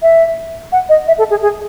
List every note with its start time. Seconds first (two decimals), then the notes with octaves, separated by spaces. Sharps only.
0.02 E5
0.72 F#5
0.89 D#5
1.07 E5
1.18 A4
1.30 G#4
1.42 G#4